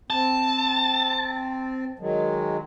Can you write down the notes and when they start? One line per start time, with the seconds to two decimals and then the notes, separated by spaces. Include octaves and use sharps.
0.10 C4 A5
1.99 D#3 F#3 G#3